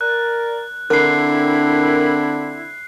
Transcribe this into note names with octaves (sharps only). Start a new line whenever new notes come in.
A#4 D5 F#6
D3 C4 D4 E4 A#4 F#6 C7